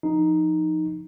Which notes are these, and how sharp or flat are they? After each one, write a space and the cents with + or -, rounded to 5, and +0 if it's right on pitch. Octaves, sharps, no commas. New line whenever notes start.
F3 +0 D#4 +0